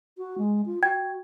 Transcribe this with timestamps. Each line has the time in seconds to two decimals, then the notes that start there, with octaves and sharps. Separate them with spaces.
0.18 F#4
0.38 G#3
0.66 F4
0.83 F#4 G5 G#6